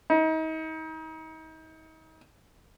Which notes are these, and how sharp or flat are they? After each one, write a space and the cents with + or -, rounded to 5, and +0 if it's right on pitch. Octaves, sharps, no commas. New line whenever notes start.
D#4 +35